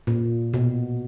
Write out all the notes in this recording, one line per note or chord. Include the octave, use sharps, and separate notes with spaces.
A#2
B2